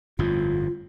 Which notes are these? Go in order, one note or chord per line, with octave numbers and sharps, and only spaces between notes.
G1 F2 A2 F4